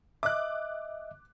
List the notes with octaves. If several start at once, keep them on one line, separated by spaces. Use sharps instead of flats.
D#5 E5 D6 F#6